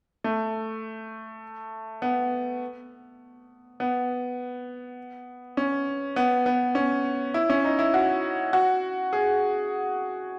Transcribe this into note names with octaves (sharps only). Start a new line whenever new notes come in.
A3
B3
B3
C#4
B3
B3
C#4
E4
C#4
D#4
E4
F#4
F#4
G#4